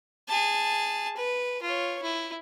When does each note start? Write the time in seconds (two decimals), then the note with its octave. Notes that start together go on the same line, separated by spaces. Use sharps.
0.29 G#4 A5
1.17 B4
1.62 F4 C#5
2.02 E4